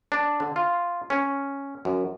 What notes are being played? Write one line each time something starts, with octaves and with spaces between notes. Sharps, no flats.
D4
D3
F4
C#4
F#2